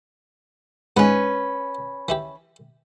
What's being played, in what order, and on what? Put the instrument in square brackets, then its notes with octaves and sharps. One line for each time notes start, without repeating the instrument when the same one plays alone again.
[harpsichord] G#2 B3 [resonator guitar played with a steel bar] C#4 B4
[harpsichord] E3 E4 G4